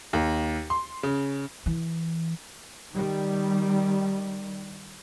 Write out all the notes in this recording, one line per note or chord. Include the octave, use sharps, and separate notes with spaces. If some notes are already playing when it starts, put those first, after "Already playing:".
D#2
C6
C#3
E3
D#3 G3